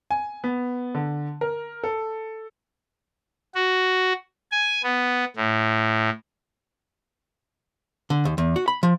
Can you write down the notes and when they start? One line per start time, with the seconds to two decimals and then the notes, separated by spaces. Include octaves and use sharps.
0.11 G#5
0.44 B3
0.95 D3
1.41 A#4
1.84 A4
3.55 F#4
4.51 G#5
4.83 B3
5.36 A2
8.10 D3
8.25 D#2
8.38 E2
8.56 F#4
8.68 B5
8.83 F3